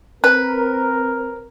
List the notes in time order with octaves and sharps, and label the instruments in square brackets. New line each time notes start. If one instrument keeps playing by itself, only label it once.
[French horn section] C4 [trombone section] A#4 [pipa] B4